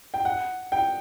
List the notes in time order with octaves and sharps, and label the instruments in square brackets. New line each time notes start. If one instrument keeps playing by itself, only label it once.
[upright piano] G5
F#5
G5